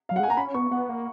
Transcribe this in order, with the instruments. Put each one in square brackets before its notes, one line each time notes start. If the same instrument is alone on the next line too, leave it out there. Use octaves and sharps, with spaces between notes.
[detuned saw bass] F#3 [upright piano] F5
[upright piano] F#5
[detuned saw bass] G#3 [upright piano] G#5
[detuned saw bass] A#3 [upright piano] A#5
[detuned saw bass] C#4 [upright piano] B5
[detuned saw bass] B3 [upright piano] C#6
[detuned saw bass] B3 [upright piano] F#5
[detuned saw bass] A#3